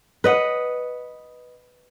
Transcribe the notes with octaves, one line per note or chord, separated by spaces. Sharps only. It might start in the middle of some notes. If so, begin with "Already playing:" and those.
B4 D#5 F#5